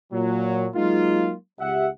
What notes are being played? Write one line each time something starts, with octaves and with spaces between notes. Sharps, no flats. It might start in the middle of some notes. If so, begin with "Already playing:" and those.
A#2 F#3
F#3 G#3 A#3 D#4 F4
C#2 G4 E5 F#5